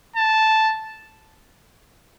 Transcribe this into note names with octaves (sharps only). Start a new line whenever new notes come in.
A5